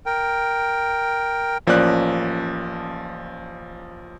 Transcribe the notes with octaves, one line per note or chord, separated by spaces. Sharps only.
A#4 G5
A1 F3 A#3 C#4 D5 F#6